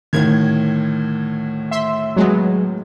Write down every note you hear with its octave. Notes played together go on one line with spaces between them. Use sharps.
D2 A2 D#3 G#6
E5 C6
F#3 G#3 B3